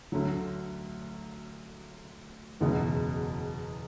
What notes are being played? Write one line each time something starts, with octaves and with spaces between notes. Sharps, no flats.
D2 D3 F#3
F#1 E2 B2 G#3 B3